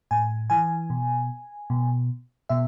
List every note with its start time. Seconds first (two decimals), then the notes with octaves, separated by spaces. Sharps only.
0.11 A2 G#5
0.50 E3 G#5
0.90 B2
1.70 B2
2.49 B2 E5